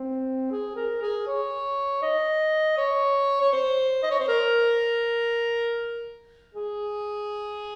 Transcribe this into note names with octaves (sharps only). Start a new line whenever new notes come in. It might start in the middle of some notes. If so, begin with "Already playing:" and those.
Already playing: C4
G#4
A#4
G#4
C#5
D#5
C#5
C#5
C5
D#5
C#5
C5
A#4
G#4